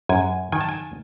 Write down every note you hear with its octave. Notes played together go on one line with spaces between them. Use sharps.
F#2 G#5
D#3 G#5
A5
G#5